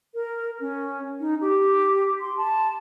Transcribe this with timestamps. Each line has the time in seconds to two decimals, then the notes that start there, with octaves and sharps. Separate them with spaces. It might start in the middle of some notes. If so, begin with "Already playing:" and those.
0.14 A#4
0.60 C#4
1.20 D#4
1.41 G4
2.21 C6
2.37 A5